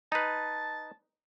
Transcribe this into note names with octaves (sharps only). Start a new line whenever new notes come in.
D#4 B4 A5